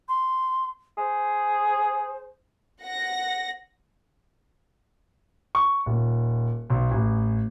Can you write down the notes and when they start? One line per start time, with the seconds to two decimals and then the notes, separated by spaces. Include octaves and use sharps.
0.08 C6
0.98 G#4 C5
2.83 F#5 A#6
5.55 C#6
5.86 D#1
6.70 B1
6.91 A1